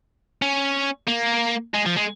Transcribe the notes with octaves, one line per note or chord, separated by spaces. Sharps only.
C#4
A#3
G#3
F3
G#3